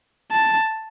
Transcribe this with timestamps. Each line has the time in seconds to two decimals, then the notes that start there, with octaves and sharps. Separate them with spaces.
0.32 A5